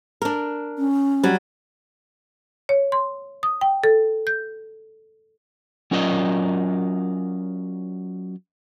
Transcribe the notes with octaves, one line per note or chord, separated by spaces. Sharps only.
D4 A#4
C#4
F#3 G3
C#5
C6
D#6
G5
A4
G6
F#3 C#4 F4 A#4 D5 D#5